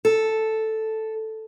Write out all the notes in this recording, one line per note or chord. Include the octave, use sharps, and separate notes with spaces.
A4